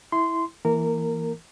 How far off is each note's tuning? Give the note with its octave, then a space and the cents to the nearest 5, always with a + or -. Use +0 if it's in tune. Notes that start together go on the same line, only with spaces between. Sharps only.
E4 -5 C6 -10
E3 +0 A#3 +0 A#4 -20